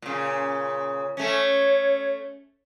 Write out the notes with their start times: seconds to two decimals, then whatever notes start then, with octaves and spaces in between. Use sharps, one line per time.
0.02 A#2 C#3
1.17 A3 C#4 C#5